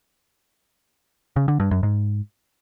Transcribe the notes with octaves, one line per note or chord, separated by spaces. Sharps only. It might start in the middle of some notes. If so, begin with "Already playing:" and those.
C#3
D3
G2
F#2
G#2